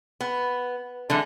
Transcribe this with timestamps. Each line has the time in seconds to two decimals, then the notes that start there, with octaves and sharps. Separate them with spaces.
0.21 B3
1.10 D3 E3 G#3